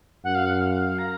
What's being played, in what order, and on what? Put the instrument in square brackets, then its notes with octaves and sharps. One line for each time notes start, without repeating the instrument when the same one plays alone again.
[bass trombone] F#2 [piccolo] F#5
[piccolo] F5
F#5
F5
A#5